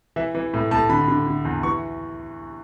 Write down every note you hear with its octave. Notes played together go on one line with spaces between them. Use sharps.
E3 E5
E3
A2
A2 A5
D3 B5
D3
D3
E2
E3 C#6